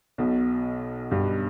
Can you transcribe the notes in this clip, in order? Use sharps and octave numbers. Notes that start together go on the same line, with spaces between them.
B1 B2
G2